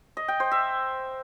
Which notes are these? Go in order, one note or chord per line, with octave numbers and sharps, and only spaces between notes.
D#5
G5
C5
E5